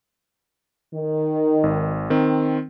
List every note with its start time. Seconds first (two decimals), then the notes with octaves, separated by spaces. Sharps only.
0.94 D#3
1.63 G#1
2.10 D#3 C4